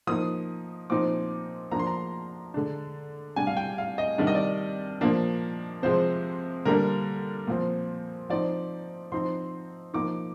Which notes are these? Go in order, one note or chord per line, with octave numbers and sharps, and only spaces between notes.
F3 A#3 D#4 D#6
A#2 F3 C4 D#4 D6
F3 A#3 D4 A#5
C6
A#5
D3 G#3 D4
C3 G3 D4 G#5
F5
G5
F5
D#5
C3 D#3 G3 D4 D5
D#5
D5
A#2 F3 A#3 D4
C3 F3 G#3 C5
D3 G3 A#3 D4 A#4
A#2 F3 C4
F3 C4 D#4 D5
F3 C4 D#4 C6
F3 A#3 D#4 D6